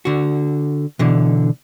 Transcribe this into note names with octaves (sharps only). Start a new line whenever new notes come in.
D3 F#4
B2 D3 E3